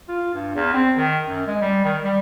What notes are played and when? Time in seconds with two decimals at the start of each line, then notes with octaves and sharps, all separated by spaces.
0.08 F4
0.34 G2
0.56 E2
0.73 C4
0.97 D#3
1.27 F#2
1.47 G#3
1.61 G3
1.84 D#3
2.04 G3